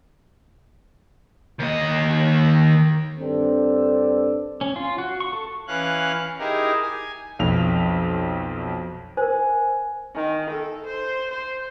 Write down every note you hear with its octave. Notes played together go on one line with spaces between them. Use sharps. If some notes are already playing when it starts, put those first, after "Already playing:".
D#2 D#5
G2 C4 D4 A4
C#4
F4
F#4
C#6
A4
E3 C#4 F5 F#6
D#4 E4 G4 G#4 A#4
G#5
B1 F2 F7
A#4 C5 G#5
D#3
A4
C5
C5